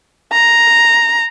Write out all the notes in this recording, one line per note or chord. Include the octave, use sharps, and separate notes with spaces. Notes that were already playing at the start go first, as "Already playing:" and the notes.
A#5